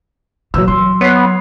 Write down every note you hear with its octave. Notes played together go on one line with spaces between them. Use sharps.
A#1 A#2 E3 F#3 E6
F#3 C6
B3 C#5 C7